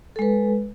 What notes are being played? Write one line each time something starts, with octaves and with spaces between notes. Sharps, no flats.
G#3 A4 B4